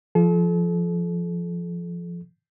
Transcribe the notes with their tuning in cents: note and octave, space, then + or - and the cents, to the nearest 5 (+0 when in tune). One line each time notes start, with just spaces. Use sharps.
F3 -15 A4 -40